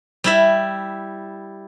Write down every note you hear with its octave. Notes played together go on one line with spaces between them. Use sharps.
G3 E4 E5